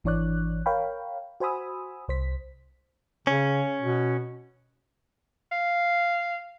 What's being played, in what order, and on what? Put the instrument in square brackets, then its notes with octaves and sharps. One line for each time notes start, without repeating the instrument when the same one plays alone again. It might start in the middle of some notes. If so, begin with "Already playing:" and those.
[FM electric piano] G#1 E3 D4 C#5 D5 F#6
A#4 C#5 F5 G5 B5
F#4 C5 G#5 B5 D#6 E6
C2 C5 B6
[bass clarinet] C#3 [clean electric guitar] C#4
[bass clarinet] B2
[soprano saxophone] F5